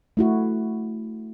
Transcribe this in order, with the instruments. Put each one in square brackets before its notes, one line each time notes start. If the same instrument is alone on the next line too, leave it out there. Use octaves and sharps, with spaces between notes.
[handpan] A3 E4 F#4